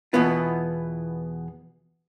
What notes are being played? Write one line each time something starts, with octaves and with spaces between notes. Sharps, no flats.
E2 B2 E3 B3 F4